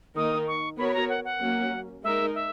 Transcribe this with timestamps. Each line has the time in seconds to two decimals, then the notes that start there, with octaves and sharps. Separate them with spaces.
0.16 D#3 A#3 D#4 A#4 D#6
0.48 C#6
0.78 B3 F#4 A#4 C#5 B5
0.88 B5
0.94 A#5
1.09 F#5
1.25 F#5
1.41 F#3 A#3 C#4
2.04 G#3 D#4 A#4 E5
2.35 E5